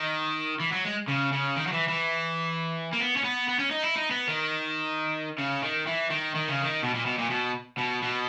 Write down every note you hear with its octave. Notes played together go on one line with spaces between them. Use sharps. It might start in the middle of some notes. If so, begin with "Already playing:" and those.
Already playing: D#3
E3
F#3
G#3
C#3
C#3
D#3
F#3
E3
E3
A#3
B3
C#4
B3
B3
C#4
D#4
E4
D#4
B3
D#3
C#3
D#3
E3
D#3
D#3
C#3
D#3
B2
A#2
B2
A#2
B2
B2
B2